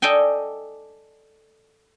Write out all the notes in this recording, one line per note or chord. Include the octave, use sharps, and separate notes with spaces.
A4 D5 D#5 G5 G#5